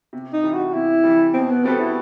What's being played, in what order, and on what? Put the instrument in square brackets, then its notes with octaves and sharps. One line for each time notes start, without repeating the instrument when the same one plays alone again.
[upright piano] C3
[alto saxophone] D#4
[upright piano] E3 G3
[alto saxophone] F#4
[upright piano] C3 [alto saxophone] E4
[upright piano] E3 G3
[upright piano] B2 [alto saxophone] C4
[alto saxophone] B3
[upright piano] G3 B3 F#4 A4 [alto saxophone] C4
[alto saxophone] E4